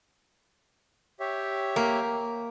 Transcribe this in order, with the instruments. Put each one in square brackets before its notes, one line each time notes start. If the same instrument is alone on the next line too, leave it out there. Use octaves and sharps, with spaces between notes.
[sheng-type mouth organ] G4 C#5 E5
[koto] A#3